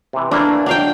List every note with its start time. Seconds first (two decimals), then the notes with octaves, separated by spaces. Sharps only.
0.13 C3 E3
0.31 E3 A3 A#3 D4
0.66 F#3 D4 F5 G5